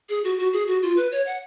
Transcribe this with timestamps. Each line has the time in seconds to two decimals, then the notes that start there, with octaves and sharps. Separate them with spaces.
0.09 G#4
0.24 F#4
0.38 F#4
0.53 G#4
0.68 F#4
0.83 F4
0.97 B4
1.12 C#5
1.26 F#5